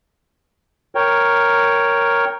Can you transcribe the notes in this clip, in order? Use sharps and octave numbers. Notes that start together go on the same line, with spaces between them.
A#4 C#5 G5